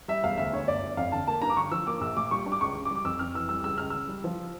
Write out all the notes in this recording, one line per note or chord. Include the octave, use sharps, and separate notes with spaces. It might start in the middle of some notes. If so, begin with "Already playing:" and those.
G3 E5
E1 F5
D2 E5
D3 C#5
G1 D5
G1
F2 F5
D3 A5
A#3 A5
G2 A#5
D6
D3 C#6
F3 E6
A#3 D6
A#1 E6
A#2 D6
G3 C#6
D4
D6
C#2 C#6
C#3
D6
G3
D6
F2 E6
F2 F6
E3 E6
G3 E6
C#2 E6
C#2 F6
C#3 E6
G3
F3